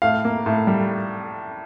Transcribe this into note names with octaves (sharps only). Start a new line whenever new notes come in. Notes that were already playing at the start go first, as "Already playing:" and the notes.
A2 F5
A#3
A2
G3